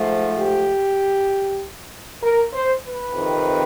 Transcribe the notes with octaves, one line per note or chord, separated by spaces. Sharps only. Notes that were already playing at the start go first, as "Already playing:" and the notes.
Already playing: G#2 F3 A3
G4
A#4
C5
B4
F2 C3 D#3